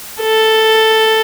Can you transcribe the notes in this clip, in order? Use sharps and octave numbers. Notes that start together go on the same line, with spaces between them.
A4